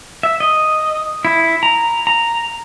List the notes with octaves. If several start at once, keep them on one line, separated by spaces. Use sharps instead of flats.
E5
D#5
E4
A#5
A#5